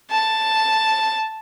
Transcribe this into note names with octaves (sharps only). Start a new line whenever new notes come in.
A5